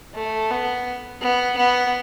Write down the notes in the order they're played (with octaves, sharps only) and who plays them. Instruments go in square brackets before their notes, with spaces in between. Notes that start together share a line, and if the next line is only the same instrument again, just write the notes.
[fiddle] A3
B3
B3
B3